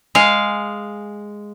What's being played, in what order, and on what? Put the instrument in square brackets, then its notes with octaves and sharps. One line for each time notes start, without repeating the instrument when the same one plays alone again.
[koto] G#3 F5